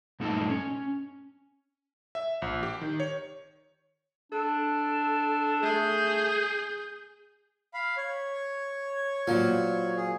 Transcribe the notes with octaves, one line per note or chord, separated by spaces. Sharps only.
G2 A#2 A3 D#4 A4 D#5
C#4
E5
A#1
G4
D#3
C#5
D4 A4
A3 G#4 G6
F5 B5
C#5
A#2 F3 F#3
G#4